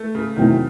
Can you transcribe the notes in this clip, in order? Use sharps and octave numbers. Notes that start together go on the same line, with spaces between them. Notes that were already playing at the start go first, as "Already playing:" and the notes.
Already playing: A3
C#3
E2 C3 D#3 F#3 C4